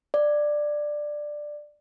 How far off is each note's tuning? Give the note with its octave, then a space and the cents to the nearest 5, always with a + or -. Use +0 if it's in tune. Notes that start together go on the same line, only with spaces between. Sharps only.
D5 +10